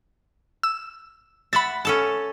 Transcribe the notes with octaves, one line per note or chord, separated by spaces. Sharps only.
E6
E5 F#5 B5 A6
C#4 A4 A5